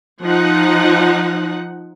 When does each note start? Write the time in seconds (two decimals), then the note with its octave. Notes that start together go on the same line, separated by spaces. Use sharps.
0.23 F3 D#4 F#5